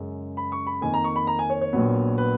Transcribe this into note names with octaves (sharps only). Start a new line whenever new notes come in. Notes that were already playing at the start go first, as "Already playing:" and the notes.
Already playing: F#2 C#3 G#3
B5
C#6
B5
F2 D#3 A#3 G#5
A#5
C#6
B5
A#5
G#5
C#5
C#5
A#1 A#2 F#3 B3
B4